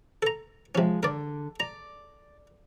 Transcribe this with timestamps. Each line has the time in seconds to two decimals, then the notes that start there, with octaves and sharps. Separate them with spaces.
0.22 A4 A#5
0.75 C3 F3 G#3 C#4
1.03 D3 A#4 D5
1.60 D5 A#5